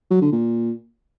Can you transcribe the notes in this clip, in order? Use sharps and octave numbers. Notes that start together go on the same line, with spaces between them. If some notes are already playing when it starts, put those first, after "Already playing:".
F#3
D3
A#2